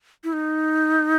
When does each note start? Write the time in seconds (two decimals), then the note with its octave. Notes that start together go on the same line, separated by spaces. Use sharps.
0.24 E4
0.33 D#4